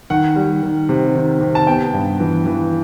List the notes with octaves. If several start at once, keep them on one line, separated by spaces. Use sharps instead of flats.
D#3 F#5
G3
D#3
C3
D#3
C3
A5
B3 G5
G2
E3
E3